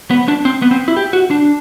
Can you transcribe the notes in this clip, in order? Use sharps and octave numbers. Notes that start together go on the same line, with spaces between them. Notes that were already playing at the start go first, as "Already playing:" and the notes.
B3
D4
C4
B3
C4
E4
G4
F#4
D4